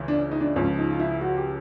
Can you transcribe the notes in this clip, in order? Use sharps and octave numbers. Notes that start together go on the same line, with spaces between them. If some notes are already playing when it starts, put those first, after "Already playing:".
Already playing: C#2 C#3 E3
D4
D#4
D4
C#2 C#3 F3 C#4
D#4
F4
E4
F#4
G4